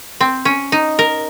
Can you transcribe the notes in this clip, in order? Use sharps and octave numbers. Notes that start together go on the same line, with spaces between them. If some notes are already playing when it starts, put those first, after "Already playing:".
C4
C#4
D#4
A#4